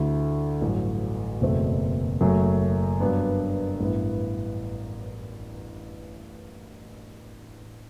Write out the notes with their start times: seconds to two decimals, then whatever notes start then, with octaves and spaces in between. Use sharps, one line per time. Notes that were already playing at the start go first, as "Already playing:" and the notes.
Already playing: D2 D3 A3 E4
0.61 A1 G2 F#3
1.41 F#1 E2 B2 A3 C4
2.21 F#1 F#2 F#3 A3
3.00 G2 F#3 B3 D4
3.80 A1 G2 E3 B3 E4